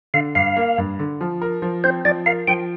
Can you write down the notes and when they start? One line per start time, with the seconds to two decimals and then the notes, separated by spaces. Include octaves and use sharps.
0.14 D3 F5
0.35 G2 F5
0.56 A#3
0.78 G2
0.99 D3
1.21 F3
1.42 A#4
1.62 F3
1.84 C4 C5
2.05 F3 D5
2.26 A#4 F5
2.48 F3 G5